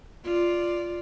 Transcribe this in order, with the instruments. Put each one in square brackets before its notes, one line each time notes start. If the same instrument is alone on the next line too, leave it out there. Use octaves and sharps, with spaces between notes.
[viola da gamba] F4 D5